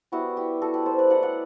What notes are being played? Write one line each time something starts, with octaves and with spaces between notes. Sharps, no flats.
G3 B3 E4 F#4
G4
F#4 A4
G4 B4
A4 C5
B4 D5
F#3 A3 E4 D5 F#5
D5 F#5